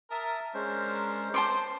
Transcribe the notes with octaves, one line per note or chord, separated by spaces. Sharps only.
A#4 E5 A5 D#6
G#3 C#4 D4 A#4 C5
C5 A5 C6 D6